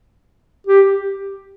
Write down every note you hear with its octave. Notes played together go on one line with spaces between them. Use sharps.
G4